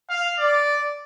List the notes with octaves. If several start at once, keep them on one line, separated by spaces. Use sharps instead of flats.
F5
D5